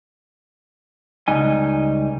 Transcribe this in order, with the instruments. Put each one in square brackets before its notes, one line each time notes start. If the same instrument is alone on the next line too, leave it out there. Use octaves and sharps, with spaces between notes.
[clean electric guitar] C#2 G3 D#4 G#5